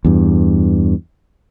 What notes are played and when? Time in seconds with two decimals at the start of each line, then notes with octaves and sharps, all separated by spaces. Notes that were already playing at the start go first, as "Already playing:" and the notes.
0.05 E2 G2